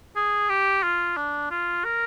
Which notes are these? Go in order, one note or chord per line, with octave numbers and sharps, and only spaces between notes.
G#4
G4
F4
D4
F4
A#4